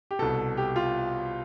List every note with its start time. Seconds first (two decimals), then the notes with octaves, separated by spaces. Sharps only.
0.11 G4
0.19 C2 B2 A4
0.57 G4
0.76 F4